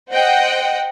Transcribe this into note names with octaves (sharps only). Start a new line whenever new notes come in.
C5 D#5 F#5 G5